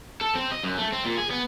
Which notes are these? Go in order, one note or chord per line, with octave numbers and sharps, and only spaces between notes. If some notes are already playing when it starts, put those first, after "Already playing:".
A4
C4
D#5
F#2
A3
C4
A#2
G#4
B3